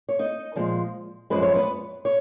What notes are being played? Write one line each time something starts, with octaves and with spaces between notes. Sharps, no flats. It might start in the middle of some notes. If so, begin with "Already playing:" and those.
C#5
D#4 D#5
A#2 F3 G#3
F#2 F3 G#3 B4
C#5
B3 B4
C#5